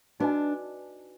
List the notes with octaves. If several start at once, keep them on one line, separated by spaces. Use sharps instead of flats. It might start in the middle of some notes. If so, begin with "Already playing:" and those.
D4 D#4 F#4 B4 D#5 G#5